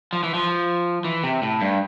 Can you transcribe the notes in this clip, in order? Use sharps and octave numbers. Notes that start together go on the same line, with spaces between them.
F3
E3
F3
E3
C3
A2
G2